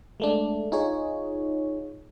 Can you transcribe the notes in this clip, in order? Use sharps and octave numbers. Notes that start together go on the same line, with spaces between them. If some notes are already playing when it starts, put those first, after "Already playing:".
G#3 A3 D4
D#4 F4 G#4 C#5